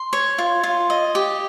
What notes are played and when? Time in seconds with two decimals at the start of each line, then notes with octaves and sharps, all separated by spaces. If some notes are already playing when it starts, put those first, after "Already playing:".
Already playing: C6
0.13 C#5
0.38 F4
0.64 F4
0.90 D#5
1.15 G4